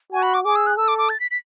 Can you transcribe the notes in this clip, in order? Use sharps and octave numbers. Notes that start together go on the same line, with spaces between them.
F#4 G#5
B5
D6
G#4 D6
E6
F#6
A4 E6
D6
D6
A6
B6
B6